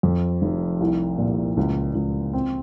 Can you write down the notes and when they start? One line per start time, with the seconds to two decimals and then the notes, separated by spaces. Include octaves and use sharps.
0.03 F2
0.42 F1
0.80 C2
1.18 A#2
1.57 C#2
1.95 C#2
2.33 C4